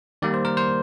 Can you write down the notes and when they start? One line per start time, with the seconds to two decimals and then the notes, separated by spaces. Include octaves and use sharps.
0.22 D#3 G3 A#3 D5
0.34 C5
0.45 A#4
0.57 C5